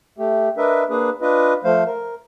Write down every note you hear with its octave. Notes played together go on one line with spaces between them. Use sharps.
A3 G4
D4 A#4 B4 D#5 E5
A#3 D4 G#4 B4
D4 F4 B4 D#5
F3 A3 C5 F5
A#4